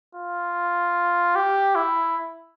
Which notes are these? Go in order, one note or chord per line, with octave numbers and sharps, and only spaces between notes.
F4
G4
E4